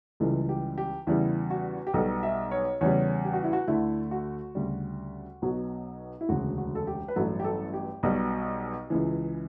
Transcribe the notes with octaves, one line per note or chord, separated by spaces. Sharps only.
C#2 C#3 E3 G3 A4
G4
G4
E2 C#3 G3 E4
F#4
G4
B1 B2 G3 A4
E5
C#5
E2 C#3 G3 C#5
G4
F#4
E4
F#4
D2 D3 A3 E4
F#4
D2 C#3 G3
B1 B2 F#3
E4
E1 D2 C#3 F#4
F#4
A4
G4
B4
A1 G2 F#3 A4
G4
A4
G4
B1 B2 G3
C#2 C#3 E3